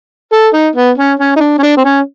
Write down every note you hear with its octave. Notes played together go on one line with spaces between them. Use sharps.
A4
D#4
B3
C#4
C#4
D#4
D4
C#4
D4
C4
C#4